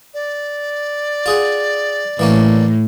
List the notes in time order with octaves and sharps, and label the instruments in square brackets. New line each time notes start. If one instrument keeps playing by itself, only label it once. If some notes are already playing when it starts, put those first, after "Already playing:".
[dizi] D5
[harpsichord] F4 G#4 F#5
[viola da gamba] A2 [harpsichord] E3 A#3 C#4